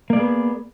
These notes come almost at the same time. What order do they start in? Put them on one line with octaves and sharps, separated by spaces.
A#3 D5 G#4 B3